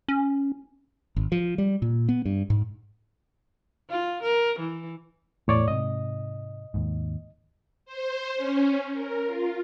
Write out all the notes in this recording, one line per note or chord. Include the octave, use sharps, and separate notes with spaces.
C#4
G#1
F3
G3
A#2
B3
G2
G#2
F4
A#4
E3
E2 A2 C#5 D5
G#2 C3 D#5
D#2 G#2
C5
C#4
A#4
F4